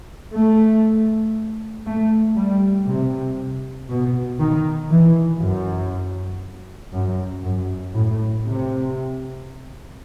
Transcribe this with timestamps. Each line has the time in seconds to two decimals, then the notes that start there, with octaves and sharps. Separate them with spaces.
0.33 A3
1.86 A3
2.37 G3
2.86 C3
3.89 B2
4.40 D#3
4.90 E3
5.41 F#2
6.93 F#2
7.43 F#2
7.95 A2
8.46 C3